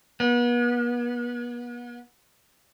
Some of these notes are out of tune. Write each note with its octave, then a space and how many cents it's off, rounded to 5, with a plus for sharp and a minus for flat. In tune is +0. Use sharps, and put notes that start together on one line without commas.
B3 -40